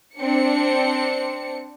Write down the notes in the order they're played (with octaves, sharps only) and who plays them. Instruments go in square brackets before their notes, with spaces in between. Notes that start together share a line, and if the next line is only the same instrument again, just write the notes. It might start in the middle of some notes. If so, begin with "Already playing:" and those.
[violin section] C4 D4 C#7